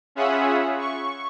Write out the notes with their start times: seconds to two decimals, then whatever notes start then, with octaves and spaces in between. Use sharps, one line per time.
0.15 C#4 F4 G#4 E5 F#5 B5
0.79 C#6